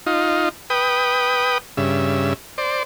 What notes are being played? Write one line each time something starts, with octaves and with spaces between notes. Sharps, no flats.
D#4 F4
B4 G5 D#6
G2 C#3 E5
C5 D5